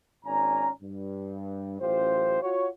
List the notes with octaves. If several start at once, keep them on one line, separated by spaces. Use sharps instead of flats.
G#1 C#4 D5 G#5 A#5
G2
A1 F#2 F4 G4 C5
F4 F#4 C#5